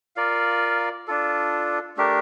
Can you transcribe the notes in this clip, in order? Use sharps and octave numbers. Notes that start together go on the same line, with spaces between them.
F4 A#4 D5 F5
D4 F4 A4
A3 D4 G4 A#4